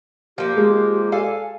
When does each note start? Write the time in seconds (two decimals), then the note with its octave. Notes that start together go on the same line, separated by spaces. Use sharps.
0.38 F3 A#3 G4
0.57 G#3
1.12 A4 F5 G#5